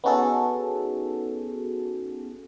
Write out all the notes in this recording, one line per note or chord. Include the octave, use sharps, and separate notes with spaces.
B3 C#4 D#4 F#4 G#4 A4